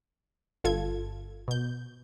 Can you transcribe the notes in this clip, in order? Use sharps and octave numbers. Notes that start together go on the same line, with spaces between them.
G1 F4 A4 G#6
B2 G6